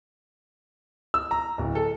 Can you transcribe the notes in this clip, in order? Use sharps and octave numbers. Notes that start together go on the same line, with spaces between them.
E6
A#5
D1
A4